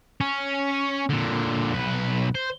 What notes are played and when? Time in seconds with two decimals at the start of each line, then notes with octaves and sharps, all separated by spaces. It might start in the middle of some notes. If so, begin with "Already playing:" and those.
0.21 C#4
1.09 A#2 D3
1.74 B1 B4
2.35 C5